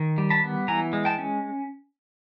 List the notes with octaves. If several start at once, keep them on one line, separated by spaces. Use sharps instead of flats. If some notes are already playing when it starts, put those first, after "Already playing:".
Already playing: D#3
G3
A5 B5
B3
E3 G#5 A#5
G#3
G5 A5
C#4